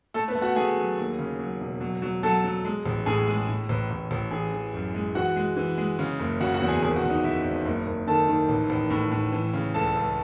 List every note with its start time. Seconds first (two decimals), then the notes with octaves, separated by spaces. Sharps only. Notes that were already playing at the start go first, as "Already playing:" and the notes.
0.14 A3 A4
0.28 B3 B4
0.35 A3
0.42 F#4 F#5
0.56 A3 G#4 G#5
0.77 F#3
0.98 D#2
1.19 C#3
1.39 F#3
1.60 E1
1.81 F#3
2.02 F#3
2.23 F#3 A4 A5
2.44 F#3
2.65 G#3
2.86 A1
3.06 A2 G#4 G#5
3.27 G#3
3.48 A2
3.69 A1
3.90 A1
4.11 A1
4.31 E3 G#4 G#5
4.52 E3
4.74 F#2
4.94 G#3
5.15 E3 F#4 F#5
5.36 G#3
5.57 E3
5.78 G#3
5.99 C#3
6.20 F#1
6.40 C#3 F#4 F#5
6.54 F#4 F#5
6.61 E2
6.68 G#4 G#5
6.82 G#1 G#4 G#5
6.96 F#4 F#5
7.03 G#1
7.10 D#4 D#5
7.24 G#1 E4 E5
7.45 G#1
7.65 F#1
7.86 F#1
8.07 D#3 A4 A5
8.28 D#3
8.49 A1
8.70 A1
8.90 A2
9.12 A2
9.32 E3
9.53 C#3
9.74 C#2 A4 A5
9.95 C#2